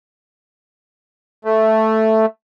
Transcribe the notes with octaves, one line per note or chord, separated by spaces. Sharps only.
A3